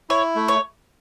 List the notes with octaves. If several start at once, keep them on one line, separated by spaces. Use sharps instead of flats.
E4 C#5
A3
C#5